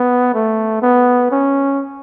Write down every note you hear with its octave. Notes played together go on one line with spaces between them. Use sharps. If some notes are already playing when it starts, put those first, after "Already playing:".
Already playing: B3
A3
B3
C#4